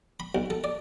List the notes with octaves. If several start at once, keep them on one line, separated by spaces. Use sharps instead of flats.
B5
B1
A4
D5